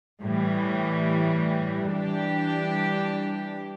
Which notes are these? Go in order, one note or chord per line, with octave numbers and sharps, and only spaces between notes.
A2 E3 G3
E3 G3 D4 G4